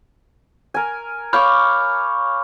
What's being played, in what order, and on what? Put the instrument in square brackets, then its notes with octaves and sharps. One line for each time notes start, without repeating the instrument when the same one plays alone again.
[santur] A#4 G#5
[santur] C#5 F5 D6 [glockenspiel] B5 F6 G6